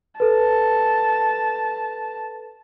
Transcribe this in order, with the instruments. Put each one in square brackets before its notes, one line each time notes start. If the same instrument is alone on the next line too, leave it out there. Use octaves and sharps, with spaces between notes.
[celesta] A4 B4 [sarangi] A5